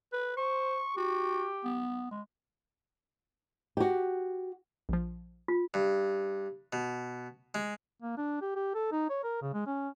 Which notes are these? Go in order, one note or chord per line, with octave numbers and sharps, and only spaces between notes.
B4
C5 C#6
F#4 G4
B3
G#3
F#4 G4
A#1 F3
F4
G2
B2
G#3
A#3
D4
G4
G4
A4
D#4
C#5
A#4
C#3
G#3
C#4